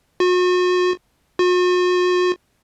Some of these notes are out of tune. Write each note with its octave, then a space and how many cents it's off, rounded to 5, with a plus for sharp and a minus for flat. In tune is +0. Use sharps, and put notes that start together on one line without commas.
F#4 -40
F#4 -45